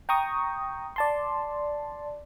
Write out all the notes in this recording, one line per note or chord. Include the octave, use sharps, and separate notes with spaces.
G5 A#5 C#6 D#6
D5 A5 C6